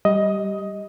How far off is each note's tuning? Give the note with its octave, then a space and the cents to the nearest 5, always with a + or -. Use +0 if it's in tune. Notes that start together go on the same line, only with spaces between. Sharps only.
G3 -5 D#5 +10